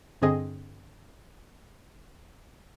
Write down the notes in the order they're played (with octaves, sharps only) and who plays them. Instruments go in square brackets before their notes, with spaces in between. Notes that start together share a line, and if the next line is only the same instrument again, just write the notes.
[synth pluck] G2 D3 C4 G#4 D#5